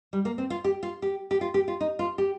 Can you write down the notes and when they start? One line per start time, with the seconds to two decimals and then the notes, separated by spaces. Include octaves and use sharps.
0.13 G3
0.25 A#3
0.38 C4
0.50 F4
0.64 G4
0.83 F4
1.02 G4
1.31 G4
1.41 F4
1.54 G4
1.68 F4
1.81 D#4
1.99 F4
2.18 G4